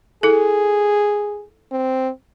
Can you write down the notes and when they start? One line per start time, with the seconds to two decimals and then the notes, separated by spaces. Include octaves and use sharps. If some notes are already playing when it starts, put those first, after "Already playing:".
0.23 E4 G#4 A4
1.72 C4